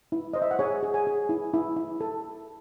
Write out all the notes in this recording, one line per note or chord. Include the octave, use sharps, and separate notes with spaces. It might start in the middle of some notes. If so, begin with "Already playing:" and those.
E4
C5 D#5
E5
F#5
G#4 C#5 G#5
G#4
G#4 G#5
G#4
E4
E4
E4
A4